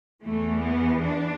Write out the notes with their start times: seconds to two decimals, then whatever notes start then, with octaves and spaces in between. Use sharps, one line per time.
0.23 E2 E3 A3
0.62 B3
1.00 D4